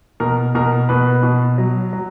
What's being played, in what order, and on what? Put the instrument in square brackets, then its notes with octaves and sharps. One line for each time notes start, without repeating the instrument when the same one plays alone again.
[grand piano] B2 A#4
B2 A#4
B2 B4
B2
F#3
F#3